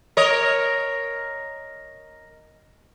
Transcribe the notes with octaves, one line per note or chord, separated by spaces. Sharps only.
A#4 C#5 D#5